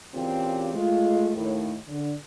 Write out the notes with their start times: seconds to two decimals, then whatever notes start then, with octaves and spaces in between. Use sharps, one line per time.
0.14 A#2 C#3 E3 C4 G4
0.73 G#3 A3 F4
1.34 D#2 A2
1.87 D3